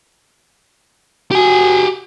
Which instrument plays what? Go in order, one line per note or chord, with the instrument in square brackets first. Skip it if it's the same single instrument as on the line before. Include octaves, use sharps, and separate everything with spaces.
[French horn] F#4 [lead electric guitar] G4 G#5